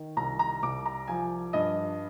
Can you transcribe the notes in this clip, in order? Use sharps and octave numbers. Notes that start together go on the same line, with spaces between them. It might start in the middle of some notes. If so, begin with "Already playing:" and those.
Already playing: D#3
C2 A#5
A#5
C2 D6
A#5
F3 G#5
G2 D#5